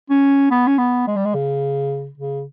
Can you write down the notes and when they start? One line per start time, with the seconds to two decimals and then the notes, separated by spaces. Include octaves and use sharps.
0.10 C#4
0.51 B3
0.67 C#4
0.78 B3
1.07 G#3
1.16 G3
1.25 G#3
1.34 C#3
2.18 C#3